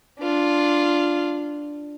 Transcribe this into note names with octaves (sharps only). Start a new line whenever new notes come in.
D4 F4